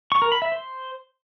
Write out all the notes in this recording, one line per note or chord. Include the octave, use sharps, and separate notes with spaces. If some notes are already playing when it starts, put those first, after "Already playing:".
C#6
A#4
B5
E5
C5